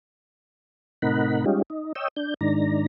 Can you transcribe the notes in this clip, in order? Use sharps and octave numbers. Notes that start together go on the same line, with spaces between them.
A2 C3 D#4 A#4 F#5 B5
G3 G#3 C#4 D#4 F4 G4
D#4
C#5 D#5 G5 E6
D4 G6
G#2 D#3 D4 A#5